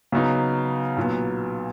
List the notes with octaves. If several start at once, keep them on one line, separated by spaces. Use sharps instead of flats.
C#3 F#3 B3 D#4
B1 A#2 F#3 B3